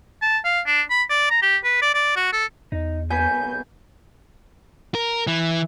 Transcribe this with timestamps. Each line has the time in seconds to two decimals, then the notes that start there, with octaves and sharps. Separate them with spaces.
0.22 A5
0.45 F5
0.67 D4
0.90 B5
1.10 D5
1.31 A#5
1.42 G4
1.64 B4
1.82 D5
1.94 D5
2.16 F#4
2.33 A4
2.72 E2 D#4
3.10 C2 B2 B4 G#5 G6
4.95 A#4
5.27 E3